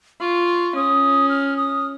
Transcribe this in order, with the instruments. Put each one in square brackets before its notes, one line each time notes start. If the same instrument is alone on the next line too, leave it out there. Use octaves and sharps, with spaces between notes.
[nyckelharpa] F4 [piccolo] C#6
[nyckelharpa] C#4 [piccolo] D#6
[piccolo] F6
D#6